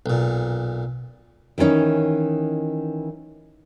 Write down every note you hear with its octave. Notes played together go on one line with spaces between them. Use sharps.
B1 A#2
D#3 E3 G3 C#4 D#4